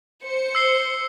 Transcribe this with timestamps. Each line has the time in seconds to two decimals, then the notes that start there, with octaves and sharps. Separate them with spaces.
0.24 C5 C#7
0.55 E6 C7 G7